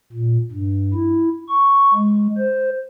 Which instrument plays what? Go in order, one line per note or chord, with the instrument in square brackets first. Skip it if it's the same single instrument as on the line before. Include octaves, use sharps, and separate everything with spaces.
[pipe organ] A#2
G2
E4
C#6
G#3
C5